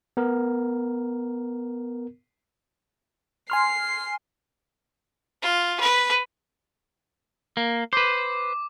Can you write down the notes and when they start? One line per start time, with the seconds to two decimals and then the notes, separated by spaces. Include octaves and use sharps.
0.17 B3 A#4
3.50 G#5 C6 F6 C7
5.42 F4
5.80 B4
7.57 A#3
7.93 B4 C5 D6